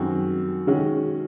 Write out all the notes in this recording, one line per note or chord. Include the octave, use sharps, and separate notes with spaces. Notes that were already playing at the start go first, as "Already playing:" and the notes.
Already playing: F#2 D#3 G#3 C4 F#4
D#3 G#3 C#4 F#4